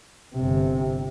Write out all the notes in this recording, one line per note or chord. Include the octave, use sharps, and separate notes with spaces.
G1 C3